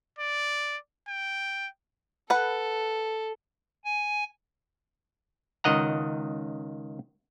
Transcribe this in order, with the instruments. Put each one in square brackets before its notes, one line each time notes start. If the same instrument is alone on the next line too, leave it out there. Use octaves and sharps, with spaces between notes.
[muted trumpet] D5
G5
[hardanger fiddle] A4 [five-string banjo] B4 F#5
[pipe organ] G#5
[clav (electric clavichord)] C#2 D#3 D#5 F#5 A#5